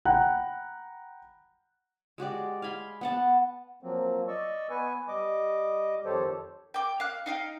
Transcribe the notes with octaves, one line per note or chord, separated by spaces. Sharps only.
F#5 G5 A#5 B5 F#6
G#3 F#4 G4 D5
F5 G#5 B5 C6
B3 F#5 A5
F3 F#3 A#3 C4
D5 D#5 C#6 E6
B3 B4 G#5 C#6
G3 D#5 D6
F2 D#3 G4 A4 C5 C#5
G5 D6
F5 F#6
D#4 F5 G5